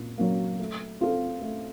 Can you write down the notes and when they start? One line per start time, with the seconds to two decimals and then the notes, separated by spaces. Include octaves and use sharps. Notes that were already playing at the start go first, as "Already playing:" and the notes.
Already playing: A#2
0.18 F#3 A#3
0.59 A3
1.00 C4 F4 A4
1.41 A3